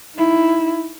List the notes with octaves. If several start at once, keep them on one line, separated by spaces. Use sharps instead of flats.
D#4 E4